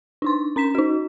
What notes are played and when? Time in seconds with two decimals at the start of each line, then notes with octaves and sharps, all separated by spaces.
0.22 D4 D#4 C6
0.56 C#4 A#5 B6 E7
0.75 D#4 F#4